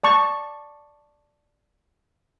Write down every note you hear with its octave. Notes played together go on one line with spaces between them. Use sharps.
D5 A5 C#6